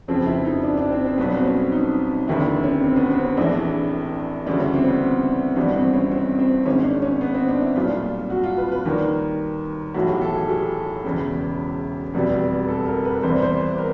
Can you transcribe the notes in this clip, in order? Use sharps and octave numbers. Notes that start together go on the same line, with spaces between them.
F1 F2 C#3 F3 C4
E4
D#4
D4
D4
C4
C4
B1 B2 G3 B3
C4
C#4
D#4
F1 D#2 D3 E4
C#4
C4
B3
C4
C#4
A#1 A2 E3 D4
D2 C#3 E3 G3 D4
C#4
C4
B3
G#1 G2 E3 G3 B3
C4
C#4
C4
C4
G#1 G#2 D#3 C#4
D4
C#4
B3
C4
D4
E4
B1 A#2 G3 F4
F#4
F4
B4
B4
D#2 D#3 G3 A#4
B1 A2 E3 F#4
G4
A4
G#4
G4
E1 E2 C#3
F1 E2 B2 G3
A4
A#4
B4
E2 C3 E3 G3 C5
C5
B4
A#4